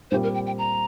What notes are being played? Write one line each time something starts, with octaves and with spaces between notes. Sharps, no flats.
A#2 G3 C4 G4 C5
A#4
G5
G5
A#5